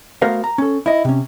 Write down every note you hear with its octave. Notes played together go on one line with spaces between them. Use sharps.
A3 B3 F#4 A#4 C5 F5
A#5
C#4 A4
E4 D#5
C3 C#4